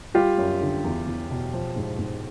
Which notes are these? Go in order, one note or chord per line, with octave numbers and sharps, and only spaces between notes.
G3 F4 G4
F#2
D3
E2
E2
B2
F3
G#2
G#2